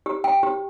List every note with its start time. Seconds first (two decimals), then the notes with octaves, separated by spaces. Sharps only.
0.06 G4
0.24 G5
0.43 G4